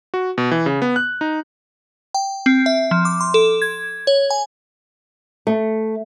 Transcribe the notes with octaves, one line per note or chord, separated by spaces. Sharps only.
F#4
B2
E3
C#3
B3
F#6
D#4
G5
C4
E5
F3
D6
C6
A4
G#6
C#5
G#5
A3